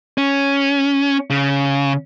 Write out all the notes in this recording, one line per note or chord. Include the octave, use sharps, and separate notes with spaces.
C#4
C#3